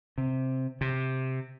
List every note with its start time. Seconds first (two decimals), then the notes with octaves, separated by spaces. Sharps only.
0.18 C3
0.81 C3